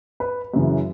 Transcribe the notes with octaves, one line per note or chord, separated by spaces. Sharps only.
B4
F#2 C#3 E3